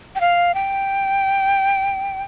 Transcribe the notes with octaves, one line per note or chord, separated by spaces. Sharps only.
G5
F5
G5